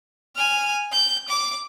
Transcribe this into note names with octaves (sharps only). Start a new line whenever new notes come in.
G#5 F6
G6
D6